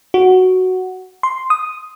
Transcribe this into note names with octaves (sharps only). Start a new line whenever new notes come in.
F#4
C6
D#6